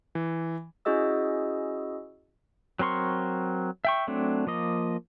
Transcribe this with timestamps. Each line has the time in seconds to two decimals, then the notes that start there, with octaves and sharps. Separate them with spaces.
0.15 E3
0.85 C#4 E4 F#4 G#4 D#5 E6
2.79 F#3 C4 A#4 C6 C#6
3.85 E5 G5 C#6
4.07 F#3 A3 C4 D4
4.47 F3 A#3 D#5